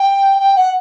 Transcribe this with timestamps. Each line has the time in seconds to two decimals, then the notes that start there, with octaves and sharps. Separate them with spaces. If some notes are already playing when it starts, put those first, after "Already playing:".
Already playing: G5
0.39 G5
0.55 F#5